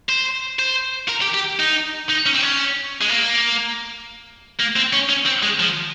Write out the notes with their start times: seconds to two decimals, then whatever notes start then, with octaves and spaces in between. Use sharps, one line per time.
0.09 C5
0.59 C5
1.09 A#4
1.22 G4
1.34 G4
1.60 D#4
2.09 D#4
2.26 C#4
2.35 C4
2.43 C#4
3.01 G#3
3.09 A#3
4.60 A#3
4.76 C4
4.93 C#4
5.09 C#4
5.26 C4
5.43 G#3
5.60 F3